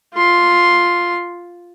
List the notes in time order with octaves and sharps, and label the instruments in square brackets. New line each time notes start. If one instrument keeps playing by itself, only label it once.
[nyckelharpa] F4 C6